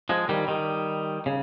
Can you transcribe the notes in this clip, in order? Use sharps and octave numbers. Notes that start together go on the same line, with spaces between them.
F3 G#3
D#3 G3
D#3 G3
C#3